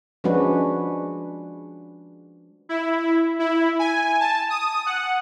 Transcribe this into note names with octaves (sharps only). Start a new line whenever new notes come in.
F3 G#3 C#4 D4 F#4 B4
E4
E4
G#5
A5
D#6
F#5